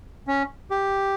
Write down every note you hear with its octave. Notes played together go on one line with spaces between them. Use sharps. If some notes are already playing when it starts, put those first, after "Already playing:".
C#4
G4